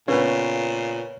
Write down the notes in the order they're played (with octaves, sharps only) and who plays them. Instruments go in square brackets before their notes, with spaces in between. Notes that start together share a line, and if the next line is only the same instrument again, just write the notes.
[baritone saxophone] A#2 [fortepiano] C#3 B3 [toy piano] B4 [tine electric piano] C#5